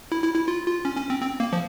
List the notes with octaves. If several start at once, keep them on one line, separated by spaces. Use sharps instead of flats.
E4
E4
E4
F4
F4
C#4
C#4
C4
C4
A#3
F3